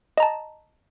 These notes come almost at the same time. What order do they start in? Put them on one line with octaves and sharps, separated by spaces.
D#5 A#5 A5